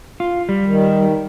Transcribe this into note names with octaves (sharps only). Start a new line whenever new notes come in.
F4
G3
D#3